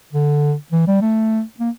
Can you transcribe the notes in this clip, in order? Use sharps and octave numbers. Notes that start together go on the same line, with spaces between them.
D3
E3
G3
A3
A#3